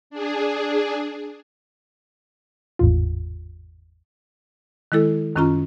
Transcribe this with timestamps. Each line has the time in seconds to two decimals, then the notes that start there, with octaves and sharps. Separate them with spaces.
0.10 D4 G#4
2.79 G#1 E2 A2 F4
4.92 D#3 G#3 E4 A4
5.36 F#2 D#3 C#4 F4 A#5